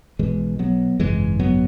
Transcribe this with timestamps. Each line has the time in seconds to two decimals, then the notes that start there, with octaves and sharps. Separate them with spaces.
0.19 B1 B2 E3 G#3
0.59 F#3 B3
0.99 G#1 F#2 C#3 E3 G#3
1.40 F#3 B3